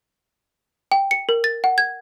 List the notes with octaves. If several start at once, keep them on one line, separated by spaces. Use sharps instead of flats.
G5
C#7
A#4
A6
F#5
G#6